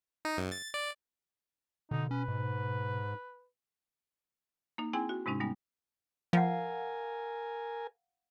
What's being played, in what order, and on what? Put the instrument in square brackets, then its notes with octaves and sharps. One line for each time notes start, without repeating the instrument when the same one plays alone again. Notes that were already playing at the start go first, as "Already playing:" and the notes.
[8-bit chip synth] D#4
F#2
A6
D5
[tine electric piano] B2 [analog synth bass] D3 [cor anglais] D#4
[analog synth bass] C#4 [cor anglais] B4
[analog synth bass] G#2
[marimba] A#3 D#4
C4 E4 G#4 G5 G#5
F#4
G#2 C3 G#3 C#4 D#4
G3 G#3 B3 D#4
[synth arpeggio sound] F3 [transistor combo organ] A#4 G#5 [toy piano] F5 F#5